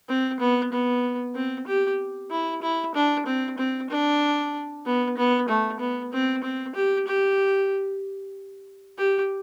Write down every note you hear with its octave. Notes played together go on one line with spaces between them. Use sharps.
C4
B3
B3
C4
G4
E4
E4
D4
C4
C4
D4
B3
B3
A3
B3
C4
C4
G4
G4
G4